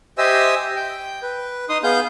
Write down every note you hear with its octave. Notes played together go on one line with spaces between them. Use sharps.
G4 C5 D#5 E5 G#5 E6
G5
B4
D#4 C6 D#6
B3 G#4 F5 G6